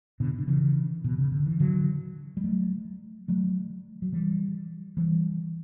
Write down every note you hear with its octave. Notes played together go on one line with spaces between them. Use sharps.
B2 D3
D3
C#3 E3
B2
C#3
D3
E3
D3 F#3
G3
F#3 A3
F#3 A3
F#3
E3 G3
E3 G3